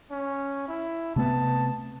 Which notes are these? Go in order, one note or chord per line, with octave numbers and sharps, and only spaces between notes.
C#4
E4
C3 A3 B3 A5